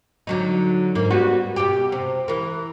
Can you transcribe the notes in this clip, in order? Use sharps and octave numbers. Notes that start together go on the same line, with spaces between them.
D3 F#3 D#4
G#2 A#3
G3 B3 F#4
B2 G4
C3
E3 A#4